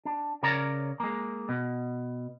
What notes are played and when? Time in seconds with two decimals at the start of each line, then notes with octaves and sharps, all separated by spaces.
0.05 D4
0.43 C#3 A#4 C#5 D5 A#5
1.00 G#3 A#3
1.49 B2